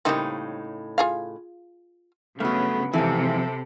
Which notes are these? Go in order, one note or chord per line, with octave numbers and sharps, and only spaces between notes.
A2 C#3 G3 A#3 C4 D#4
F4 G#4 F5
G2 C#3 F#3 A3 B3
F2 G#2 C3 E3 A4